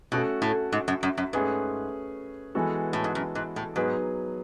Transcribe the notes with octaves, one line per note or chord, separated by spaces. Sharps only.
B2 A3 C#4 F#4 A4
A2
G#2
F#2
F#2
F#2
G#2 A3 C#4 G#4 B4
E3 G#3 B3 F#4 A4
A2
G#2
F#2
G#2
A2
G#2 F#3 B3 D#4 G#4 B4